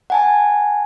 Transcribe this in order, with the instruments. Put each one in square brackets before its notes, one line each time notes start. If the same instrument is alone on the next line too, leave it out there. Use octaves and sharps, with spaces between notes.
[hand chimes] F#5 G#5 A5